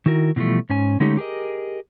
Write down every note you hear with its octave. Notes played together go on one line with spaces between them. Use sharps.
D#3 E4 F#4 A#4
B2 E3 F3 G3 A3
G#2 C#4 G#5
D3 G#3 A3 C#4 D#4 G4
G4 G#4 A#4 D#5